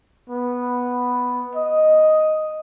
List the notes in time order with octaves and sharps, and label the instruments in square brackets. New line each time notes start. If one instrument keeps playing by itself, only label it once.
[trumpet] B3
D#5